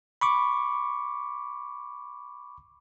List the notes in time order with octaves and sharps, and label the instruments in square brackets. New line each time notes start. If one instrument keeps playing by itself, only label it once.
[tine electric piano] B5 C#6 D6